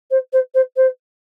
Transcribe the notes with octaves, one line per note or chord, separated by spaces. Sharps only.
C5
C5
C5
C5